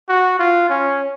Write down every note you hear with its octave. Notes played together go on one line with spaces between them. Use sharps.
F#4
F4
C#4